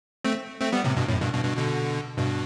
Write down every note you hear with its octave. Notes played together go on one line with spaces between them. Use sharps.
A3 C4
A3 C4
G3 B3
A2 C3
G2 B2
F#2 A2
G2 B2
G2 B2
G2 B2
B2 D3
G2 B2